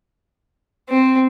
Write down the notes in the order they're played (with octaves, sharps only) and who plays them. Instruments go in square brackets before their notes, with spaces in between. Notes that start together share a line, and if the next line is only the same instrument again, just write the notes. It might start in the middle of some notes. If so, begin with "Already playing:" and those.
[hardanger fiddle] C4